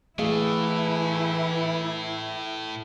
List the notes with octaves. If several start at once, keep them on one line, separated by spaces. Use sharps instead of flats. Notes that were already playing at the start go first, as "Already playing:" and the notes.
A2 E3 A3 E4 G#4 F5